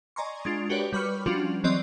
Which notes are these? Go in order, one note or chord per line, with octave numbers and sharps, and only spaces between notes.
D5 D#5 G#5 A#5 C6 C#6
G#3 D4 F4
F#4 G4 A#4 B4 C#5 D5
G3 B4 B5 C#6 F6 C#7
F3 G3 C#4 D4 F4 F#4
E3 F#3 C4 D5 D#5 C6